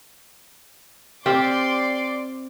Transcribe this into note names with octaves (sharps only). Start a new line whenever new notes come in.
C4 F4 G4 D5 C6 D6